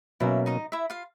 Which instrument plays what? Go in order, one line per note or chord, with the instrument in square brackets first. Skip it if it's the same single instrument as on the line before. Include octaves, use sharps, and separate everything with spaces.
[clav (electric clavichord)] B2 F#3 A#3 C#4 [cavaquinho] E4 E5
[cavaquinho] D#4 D#5
E4 E5
F4 F5